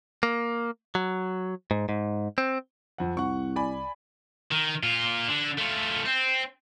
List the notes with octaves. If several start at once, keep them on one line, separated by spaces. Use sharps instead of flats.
A#3
F#3
G#2
G#2
C4
F2 F#5
C2 F#5 C#6
D5 G#5 B5
D#3
A#2 F4
D3
A3 F4
C4